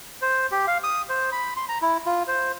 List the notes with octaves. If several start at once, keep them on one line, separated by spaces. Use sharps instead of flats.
C5
G4
F5
D#6
C5
B5
C6
A#5
E4
F4
C5